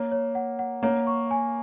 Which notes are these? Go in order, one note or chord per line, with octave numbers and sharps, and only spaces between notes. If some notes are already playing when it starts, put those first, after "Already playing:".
Already playing: A#3 C#5
C#5
F#5
F#5
A#3 C#5
C#6
G#5